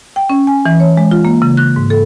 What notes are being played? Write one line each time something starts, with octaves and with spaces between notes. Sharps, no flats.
G5
C#4
G#5
E3
C#5
G#3
F4
A#3
C#3
F#6
G#2
A4